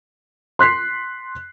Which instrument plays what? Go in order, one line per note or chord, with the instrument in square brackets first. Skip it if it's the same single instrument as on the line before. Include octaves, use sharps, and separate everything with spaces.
[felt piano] C6 F#6 B6 C7